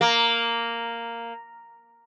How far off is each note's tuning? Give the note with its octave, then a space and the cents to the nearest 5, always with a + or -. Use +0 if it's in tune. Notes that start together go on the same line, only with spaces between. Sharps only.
A#3 -5